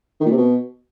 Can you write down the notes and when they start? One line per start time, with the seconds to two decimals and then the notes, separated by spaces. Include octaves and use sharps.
0.20 D#3
0.26 A#2
0.32 C3
0.37 B2